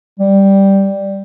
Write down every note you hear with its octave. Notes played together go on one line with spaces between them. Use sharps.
G3